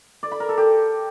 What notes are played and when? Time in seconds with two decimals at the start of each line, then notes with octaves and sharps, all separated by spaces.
0.23 D5
0.32 B5
0.40 A#4
0.49 A4
0.57 G4